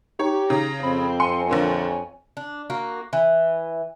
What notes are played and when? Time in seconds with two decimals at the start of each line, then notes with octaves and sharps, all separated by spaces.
0.19 D#4 G4 C#5
0.50 C#3 D#4 A#5
0.83 F2 C4 B5
1.20 G#5 C6 C#7
1.50 A#1 D3 A#3 C#5
2.37 D4
2.70 A#3 F#4
3.13 E3